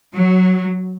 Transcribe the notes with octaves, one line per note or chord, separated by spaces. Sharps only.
F#3